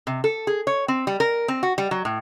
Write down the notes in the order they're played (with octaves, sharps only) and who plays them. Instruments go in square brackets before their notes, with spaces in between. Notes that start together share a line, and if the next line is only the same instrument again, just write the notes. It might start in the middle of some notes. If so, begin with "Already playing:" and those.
[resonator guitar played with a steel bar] C3
A4
G#4
C#5
C4
G3
A#4
C4
F#4
G3
F#3
A2